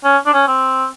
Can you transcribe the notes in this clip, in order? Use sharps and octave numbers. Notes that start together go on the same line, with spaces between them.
C#4
D4
C#4
C4